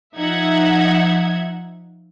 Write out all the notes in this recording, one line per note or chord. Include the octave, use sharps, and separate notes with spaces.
F3 D#4 E5 F#5 G#6